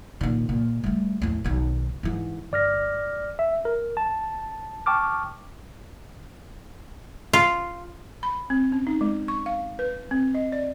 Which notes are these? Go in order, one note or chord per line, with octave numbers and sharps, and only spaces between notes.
A#2 D#3
A#2
G3 A3
E2 A2
B1 D#3
G#2 E3
G1 D5 F6 A#6
E5
A#4
A5
G5 A5 C#6 D6 F6
F4
B5
C4
C#4
D#4
G#3
C#6
F5
B4
C4
D#5
D5